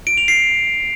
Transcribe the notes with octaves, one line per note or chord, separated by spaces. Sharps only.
D7
F7
C7